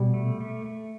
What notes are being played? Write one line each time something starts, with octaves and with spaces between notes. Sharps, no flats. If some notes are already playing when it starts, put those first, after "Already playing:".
Already playing: B2 G3
A3
A3
A3